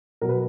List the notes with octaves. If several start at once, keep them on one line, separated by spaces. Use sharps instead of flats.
B2 F#3 A#4
B4